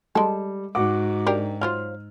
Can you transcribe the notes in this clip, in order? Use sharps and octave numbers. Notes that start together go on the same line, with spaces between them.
G3 G#3 A4
G#2 F#4 F#5 D6
D4 G4 A#4
F#3 F4 C5 F6